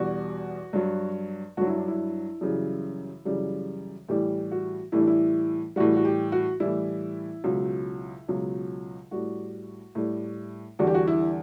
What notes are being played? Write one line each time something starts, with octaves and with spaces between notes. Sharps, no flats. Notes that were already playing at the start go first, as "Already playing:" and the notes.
Already playing: E2 B2 G3 F#4
G2 F#3
G2 F#3 F#4
E4
D4
E4
F#2 C#3 E3 G3
F#2 C#3 E3 G3
A2 E3 G3 G4
F#4
A2 E3 G3 E4
D4
E4
A2 E3 G3 F#4
F#4
G4
F#4
A2 E3 G3 E4
C#2 B2 F#3
C#2 B2 F#3
A2 G3 F#4
A2 G3
E2 D3 G3 F#4
G4
F#4
E4